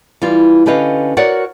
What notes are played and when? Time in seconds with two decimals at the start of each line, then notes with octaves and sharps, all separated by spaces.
0.22 E3 G3 F4
0.66 D3 C#4 G4 B4 D#5 F5
1.17 F#4 A#4 C#5 D5 F#5